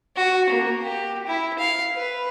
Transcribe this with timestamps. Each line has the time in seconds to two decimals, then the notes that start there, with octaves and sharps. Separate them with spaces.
0.16 F#4
0.50 A#3
0.83 G4
1.27 E4
1.59 F5
1.96 B4